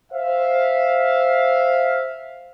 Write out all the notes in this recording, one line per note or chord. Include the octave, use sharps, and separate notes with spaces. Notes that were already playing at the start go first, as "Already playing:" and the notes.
C5 E5 F5